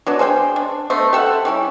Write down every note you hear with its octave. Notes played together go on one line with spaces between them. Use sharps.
F#3 B3 D4
G#4 C5 F5 G5
D4
A3 B3 C5 D#5
G4 A4 E5 F#5
G3 C#4 E4